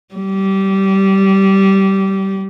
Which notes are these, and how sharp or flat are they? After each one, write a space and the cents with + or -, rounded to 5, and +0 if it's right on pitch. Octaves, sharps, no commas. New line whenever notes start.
G3 -20